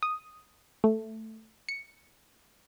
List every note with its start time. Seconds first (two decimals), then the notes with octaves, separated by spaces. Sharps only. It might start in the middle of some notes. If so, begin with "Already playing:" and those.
0.03 D#6
0.84 A3
1.69 C#7